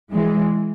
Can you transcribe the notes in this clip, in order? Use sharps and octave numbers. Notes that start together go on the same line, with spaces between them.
E3 G#3